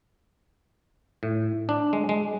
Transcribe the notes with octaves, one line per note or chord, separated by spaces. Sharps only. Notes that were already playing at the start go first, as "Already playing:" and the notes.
A2
D4
G#3
G#3